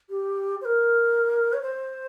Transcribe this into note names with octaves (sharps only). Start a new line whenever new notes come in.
G4
C5
A#4
C#5
C5